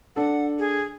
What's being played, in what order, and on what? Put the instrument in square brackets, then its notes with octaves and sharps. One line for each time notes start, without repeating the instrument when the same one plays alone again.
[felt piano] D4 A4 [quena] F#5
[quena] G#4